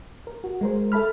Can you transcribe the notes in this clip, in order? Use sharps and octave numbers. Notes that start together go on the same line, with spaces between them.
A#4
F#4
G#3 A#4 C5
A4 E5 A5 B5 F6